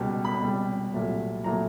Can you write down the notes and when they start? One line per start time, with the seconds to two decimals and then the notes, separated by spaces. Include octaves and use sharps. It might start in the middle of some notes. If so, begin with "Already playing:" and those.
Already playing: C#2 B2 G3
0.25 B5
0.41 C#2 B2 G3
0.93 C2 A#2 F#3 A3
1.44 A#2 F#3 A3 A#5